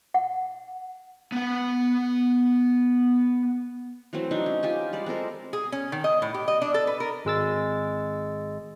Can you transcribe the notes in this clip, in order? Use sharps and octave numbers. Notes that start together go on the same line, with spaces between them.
F#5
B3 F#5
E3 F#3 A3 C4
F#3 D4 D#4
C#4
F4 G4 G#5
G3 G#3 D5
G#3 C4 A4 A#4
G#4
C#4
D#3
D#5
A2
G4
D#5
D4
A4
B4
A#4
G#1 G#3 E6 A6